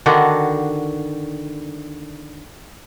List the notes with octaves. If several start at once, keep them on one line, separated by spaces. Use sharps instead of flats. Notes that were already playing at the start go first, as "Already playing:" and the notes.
D3 D#3 D4 F#4